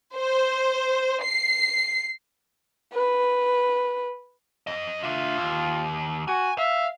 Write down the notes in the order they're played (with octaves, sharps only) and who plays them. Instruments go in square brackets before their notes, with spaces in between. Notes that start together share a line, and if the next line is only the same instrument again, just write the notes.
[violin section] C5
C7
[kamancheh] B4
[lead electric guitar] F2 D#5
[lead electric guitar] D4 E5 [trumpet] F4
[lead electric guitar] D#2
[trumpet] F#4 [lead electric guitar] G#5
[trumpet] E5 [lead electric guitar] F5